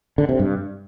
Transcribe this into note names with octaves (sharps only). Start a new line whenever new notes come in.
D3
C3
G2